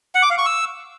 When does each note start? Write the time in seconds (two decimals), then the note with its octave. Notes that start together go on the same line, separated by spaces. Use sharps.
0.15 F#5
0.23 D6
0.30 F5
0.38 C#6
0.46 E6